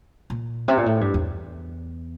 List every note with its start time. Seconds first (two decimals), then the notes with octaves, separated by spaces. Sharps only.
0.30 A#2
0.68 C3
0.77 A#2
0.86 A2
1.01 G2
1.14 E2